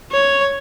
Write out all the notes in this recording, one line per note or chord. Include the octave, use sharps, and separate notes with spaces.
C#5